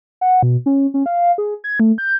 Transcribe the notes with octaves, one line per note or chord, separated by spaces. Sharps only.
F#5
B2
C#4
C#4
F5
G#4
G#6
A3
G6